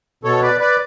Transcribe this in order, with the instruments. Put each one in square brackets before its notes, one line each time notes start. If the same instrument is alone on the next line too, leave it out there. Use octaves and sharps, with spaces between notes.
[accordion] B2 A4 C#5
B4 D5
B4 D5